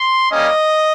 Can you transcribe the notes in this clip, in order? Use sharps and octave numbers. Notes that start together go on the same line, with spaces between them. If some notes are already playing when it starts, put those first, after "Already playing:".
Already playing: C6
G3 A#3 C#4 D#5